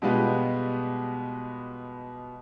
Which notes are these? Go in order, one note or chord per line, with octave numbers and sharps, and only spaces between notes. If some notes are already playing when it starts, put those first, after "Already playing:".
B2 G3 G#3 B3 F4 G4